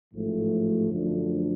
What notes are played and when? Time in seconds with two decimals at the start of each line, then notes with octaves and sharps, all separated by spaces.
0.14 A1 G#2 F3 A3
0.89 F#2 D3 F3 A3 D4